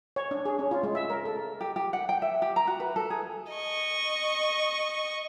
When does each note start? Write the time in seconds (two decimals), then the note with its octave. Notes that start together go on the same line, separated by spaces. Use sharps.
0.16 C#5
0.31 D4
0.45 G#4
0.59 C#4
0.71 F4
0.83 G#3
0.95 E5
1.10 A#4
1.25 A4
1.61 G4
1.76 G4
1.93 F#5
2.09 G5
2.22 E5
2.42 G4
2.56 A#5
2.67 F#4
2.80 B4
2.96 A4
3.10 G#4
3.52 D#5 C#6